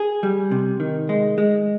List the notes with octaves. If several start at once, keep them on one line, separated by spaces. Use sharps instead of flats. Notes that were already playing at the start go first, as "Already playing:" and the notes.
Already playing: G#4
G3
C3
D#3
G#3
G#3